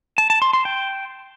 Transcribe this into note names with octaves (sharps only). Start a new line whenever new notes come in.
A5
A5
C6
C6
G5